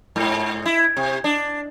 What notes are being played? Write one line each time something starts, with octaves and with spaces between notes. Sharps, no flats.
G#2
E4
C3
D4